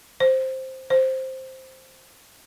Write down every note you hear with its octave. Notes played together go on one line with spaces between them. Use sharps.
C5
C5